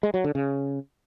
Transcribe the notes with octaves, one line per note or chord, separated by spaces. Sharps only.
G#3
F#3
D3
C#3